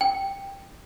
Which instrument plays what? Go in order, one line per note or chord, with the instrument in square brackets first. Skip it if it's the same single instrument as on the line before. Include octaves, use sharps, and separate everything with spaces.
[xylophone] G5